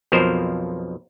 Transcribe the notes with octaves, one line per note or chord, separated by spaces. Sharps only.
B1 F2 B2 F3 A#4 C5